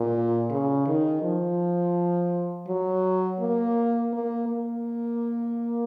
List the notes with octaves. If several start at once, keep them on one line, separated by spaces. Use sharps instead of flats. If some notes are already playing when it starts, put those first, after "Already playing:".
Already playing: A#2
C#3
D#3
F3
F#3
A#3
A#3
A#3